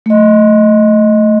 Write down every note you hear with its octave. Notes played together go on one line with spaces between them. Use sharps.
A3 D#5